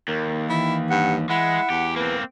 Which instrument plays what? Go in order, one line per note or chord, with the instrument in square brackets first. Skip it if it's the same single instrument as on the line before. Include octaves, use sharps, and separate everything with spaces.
[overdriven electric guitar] D#2 [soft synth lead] A#4
[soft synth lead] E3 [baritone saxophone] E4
[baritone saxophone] G2 [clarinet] F#5
[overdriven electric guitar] G#3 [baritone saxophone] E4 [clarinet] F#5
[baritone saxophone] E2 [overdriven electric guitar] G4
[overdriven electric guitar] A#3 C4 [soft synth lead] B4